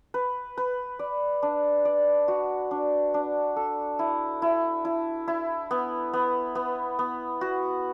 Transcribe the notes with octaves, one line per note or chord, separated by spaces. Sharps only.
B4
B4
D5
D4
D5
F#4
D4
D4
A4
E4
E4
E4
E4
B3
B3
B3
B3
F#4